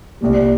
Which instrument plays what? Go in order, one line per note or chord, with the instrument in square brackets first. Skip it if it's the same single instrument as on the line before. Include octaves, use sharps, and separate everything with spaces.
[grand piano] C2 A#2 G3